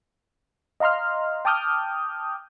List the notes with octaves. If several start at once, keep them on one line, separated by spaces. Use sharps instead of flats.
D#5 F5 A#5 C6 F6
G5 A5 D6 D#6 F6 G6